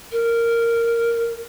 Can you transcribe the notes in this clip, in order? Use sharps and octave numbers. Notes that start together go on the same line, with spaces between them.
A#4